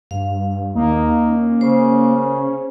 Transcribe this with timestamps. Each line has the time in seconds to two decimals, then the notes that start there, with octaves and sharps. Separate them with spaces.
0.11 G2 F5
0.75 D#2 A#3 D#4
1.29 C#4
1.61 C#3 C5